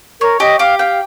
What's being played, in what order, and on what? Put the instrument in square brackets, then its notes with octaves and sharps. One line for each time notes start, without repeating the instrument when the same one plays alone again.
[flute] A#4 [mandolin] C#5
[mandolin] G4 [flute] D#5
[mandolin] G4 [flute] F5
[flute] F5 [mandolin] G5